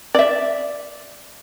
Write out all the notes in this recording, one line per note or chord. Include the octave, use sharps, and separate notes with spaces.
D5 E5